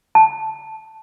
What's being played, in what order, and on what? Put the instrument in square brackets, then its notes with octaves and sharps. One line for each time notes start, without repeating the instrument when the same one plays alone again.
[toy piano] A5